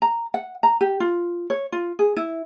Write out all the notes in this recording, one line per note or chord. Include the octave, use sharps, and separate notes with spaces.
A#5
F#5
A#5
G4
F4
C#5
F4
G#4
E4